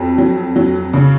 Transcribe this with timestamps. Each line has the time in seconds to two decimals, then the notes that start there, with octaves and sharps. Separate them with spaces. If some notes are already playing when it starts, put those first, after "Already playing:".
Already playing: F2 F#3
0.18 F#3
0.56 F#3
0.94 C#3